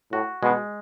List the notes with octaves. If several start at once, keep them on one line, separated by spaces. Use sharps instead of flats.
A2 F#4
B2 G#3